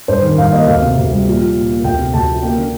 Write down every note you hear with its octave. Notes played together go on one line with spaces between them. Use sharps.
G2 C5
D#3
G2 F5
A#3 D#5
D2 F5
C3
D2
G3
A#2
F3
A#2
A#3
D2 G5
C3
D2 A5
F3
A#3 G5
D3